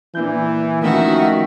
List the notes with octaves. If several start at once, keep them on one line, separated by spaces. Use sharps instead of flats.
A#2 E3 D4 G6
D#3 F3 A3 C#4 F#4 E5